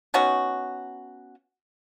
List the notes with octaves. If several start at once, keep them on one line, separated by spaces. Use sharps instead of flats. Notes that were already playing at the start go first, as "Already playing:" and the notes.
B3 C#4 D#4 F#4